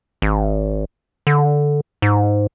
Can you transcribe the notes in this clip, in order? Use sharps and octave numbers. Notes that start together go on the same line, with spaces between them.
G#1
D3
G#2